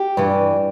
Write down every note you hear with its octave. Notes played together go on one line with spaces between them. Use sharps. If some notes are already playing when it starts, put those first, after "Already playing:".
Already playing: G4
G2 E3